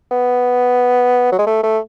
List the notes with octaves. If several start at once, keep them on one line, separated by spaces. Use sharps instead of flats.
B3
F#3
G#3
A3
A3